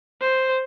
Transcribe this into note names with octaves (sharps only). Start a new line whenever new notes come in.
C5